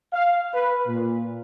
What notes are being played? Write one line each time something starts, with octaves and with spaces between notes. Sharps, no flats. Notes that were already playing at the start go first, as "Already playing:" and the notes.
F5
B4
A#2